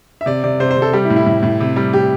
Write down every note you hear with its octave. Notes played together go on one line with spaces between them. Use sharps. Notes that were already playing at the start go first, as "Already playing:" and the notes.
E5
C3 D5
C3 D5
C3 C5
C5
C3
A4
G3 G4
E4
A2
E4
A2
A2
C3
G3
G3 G4